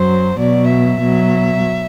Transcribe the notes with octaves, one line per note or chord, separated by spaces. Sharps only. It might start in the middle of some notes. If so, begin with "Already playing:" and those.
Already playing: F#2 F#3 C5
B2 F#3 D5
E5
B2 F#3